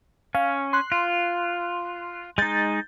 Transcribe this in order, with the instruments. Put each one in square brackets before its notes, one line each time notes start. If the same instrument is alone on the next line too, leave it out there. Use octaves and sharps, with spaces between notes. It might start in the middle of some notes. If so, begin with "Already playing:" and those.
[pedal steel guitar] C#4 [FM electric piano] F5
[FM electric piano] C6 F#6
[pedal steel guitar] F4
[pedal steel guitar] G#3 D#4 [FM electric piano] G6 A6